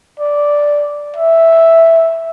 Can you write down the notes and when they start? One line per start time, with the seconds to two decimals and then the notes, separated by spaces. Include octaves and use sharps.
0.19 D5
1.16 E5